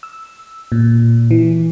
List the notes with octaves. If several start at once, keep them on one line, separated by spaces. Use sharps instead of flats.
E6
A#2
E3